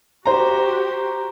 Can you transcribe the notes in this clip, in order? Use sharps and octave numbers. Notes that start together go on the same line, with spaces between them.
F#4 G4 C5 A#5